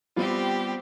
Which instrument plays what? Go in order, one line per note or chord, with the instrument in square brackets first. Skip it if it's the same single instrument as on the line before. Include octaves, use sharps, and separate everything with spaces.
[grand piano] G3 B3 F4 [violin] C4 G4